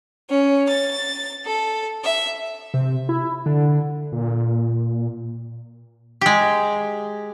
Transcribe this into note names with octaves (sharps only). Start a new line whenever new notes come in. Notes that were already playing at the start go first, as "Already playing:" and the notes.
C#4
A6
A4
E5
C3
E4
D3
A#2
G#3 G4